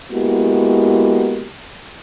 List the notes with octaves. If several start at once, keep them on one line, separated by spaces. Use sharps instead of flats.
G#3 A#3 B3 E4 F#4 G4